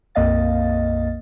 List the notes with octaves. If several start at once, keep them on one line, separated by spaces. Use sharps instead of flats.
A#1 F2 A#3 D#5 F5 A6